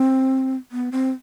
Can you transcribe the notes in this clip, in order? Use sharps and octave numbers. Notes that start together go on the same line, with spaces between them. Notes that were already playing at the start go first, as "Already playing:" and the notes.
Already playing: C4
B3
C4